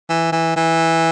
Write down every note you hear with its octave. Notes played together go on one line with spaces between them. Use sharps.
E3
E3
E3